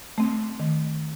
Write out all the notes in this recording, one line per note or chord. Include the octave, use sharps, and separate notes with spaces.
A3 C4
D#3